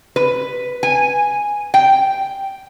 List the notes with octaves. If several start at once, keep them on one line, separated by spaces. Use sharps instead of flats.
B4
G#5
G5